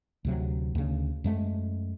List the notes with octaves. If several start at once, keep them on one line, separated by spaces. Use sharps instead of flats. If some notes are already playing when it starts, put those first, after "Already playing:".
D2 C3 F#3
D2 C#3
F#2 G#3 A3